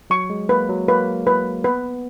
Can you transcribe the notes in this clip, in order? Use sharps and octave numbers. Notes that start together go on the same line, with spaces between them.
F#3 C#6
G#3
A#3 B4
F#3
A#3 B4
B4
B3 B4